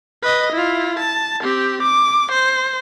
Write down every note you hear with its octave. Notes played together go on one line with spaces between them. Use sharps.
B4 D#5
E4 F4
A5
C4 G4
D6
C5